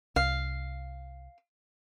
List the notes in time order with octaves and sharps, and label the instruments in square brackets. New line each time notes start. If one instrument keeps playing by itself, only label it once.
[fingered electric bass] C2 [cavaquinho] F5